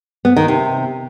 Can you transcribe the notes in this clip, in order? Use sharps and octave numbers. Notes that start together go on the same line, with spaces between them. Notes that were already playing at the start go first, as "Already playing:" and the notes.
B3
D#3
C3